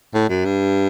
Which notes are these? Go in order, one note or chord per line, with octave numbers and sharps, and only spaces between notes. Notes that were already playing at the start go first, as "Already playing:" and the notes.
A2
F#2
G2